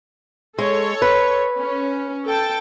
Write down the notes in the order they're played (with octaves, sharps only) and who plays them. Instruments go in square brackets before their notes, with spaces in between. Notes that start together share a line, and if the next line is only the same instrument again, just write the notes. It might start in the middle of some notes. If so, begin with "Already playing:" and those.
[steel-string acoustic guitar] G#3 [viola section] A4 C#5
[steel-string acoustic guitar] B4
[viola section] C#4
A4 G5 A5